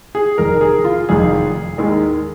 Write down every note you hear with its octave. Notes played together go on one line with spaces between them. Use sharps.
G#4
F1 F2 D#3 A#4
G#4
F4
F1 F2 D#3 G#4
D#2 D#3 G#3